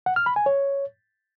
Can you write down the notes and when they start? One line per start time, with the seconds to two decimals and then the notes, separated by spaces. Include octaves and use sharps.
0.06 F#5
0.16 F6
0.26 B5
0.36 G#5
0.46 C#5